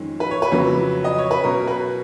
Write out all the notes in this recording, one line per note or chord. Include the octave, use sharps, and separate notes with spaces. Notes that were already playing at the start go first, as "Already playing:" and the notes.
Already playing: F2 D#3 G#3 C#4
B4
C#5
B4
F2 C#3 F#3 A#3
D#5
C#5
B4
B2 F#3 C#4 A#4
B4